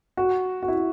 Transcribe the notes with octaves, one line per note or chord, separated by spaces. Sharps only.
F#4
F#4
E4